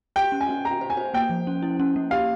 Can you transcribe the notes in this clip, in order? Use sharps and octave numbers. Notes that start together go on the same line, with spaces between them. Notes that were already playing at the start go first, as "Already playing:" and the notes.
G4 G5
C#4
G#5
C#4
G4 A#5
C5
G#5
C5
A#3 G5
F3
C#4
E4
C#4
A#3
G4 F5